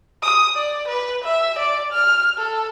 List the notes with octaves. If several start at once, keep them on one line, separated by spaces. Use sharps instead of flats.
D#6
D5
B4
E5
D5
F6
A4